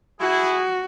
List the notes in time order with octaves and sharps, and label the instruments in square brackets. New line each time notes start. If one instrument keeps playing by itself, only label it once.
[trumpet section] E4 G#4 [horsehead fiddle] F#4